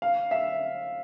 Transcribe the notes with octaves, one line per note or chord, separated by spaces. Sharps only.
F5
E5